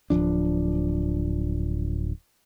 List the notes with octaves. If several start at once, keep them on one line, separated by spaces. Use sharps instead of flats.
D1 E2 F3 D4